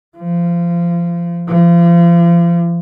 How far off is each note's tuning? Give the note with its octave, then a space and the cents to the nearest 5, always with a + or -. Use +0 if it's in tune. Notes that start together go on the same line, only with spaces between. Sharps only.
F3 -25
F3 -35